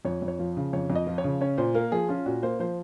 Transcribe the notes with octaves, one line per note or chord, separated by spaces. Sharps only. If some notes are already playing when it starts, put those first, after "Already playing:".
F2 C#5
F2
C#5
F3
C#3
F2 C#5
F2
D#5
F3
C#5
C#3
C#4 C#5
A#2 C5
A#3 A#4
F3 G#4
C#4 F4
A#2 F#4
A#3 C5
F3 C5